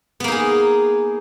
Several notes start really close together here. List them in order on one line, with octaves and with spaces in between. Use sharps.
B3 A#3 D#4 G#4